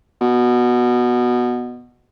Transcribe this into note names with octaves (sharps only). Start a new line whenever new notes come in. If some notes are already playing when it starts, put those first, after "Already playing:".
B2